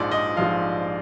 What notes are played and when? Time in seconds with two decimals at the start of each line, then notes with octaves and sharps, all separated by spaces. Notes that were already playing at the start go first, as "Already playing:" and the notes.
Already playing: A#1 G#2 F3 D5
0.11 D#5
0.37 A#1 G#2 F3 F5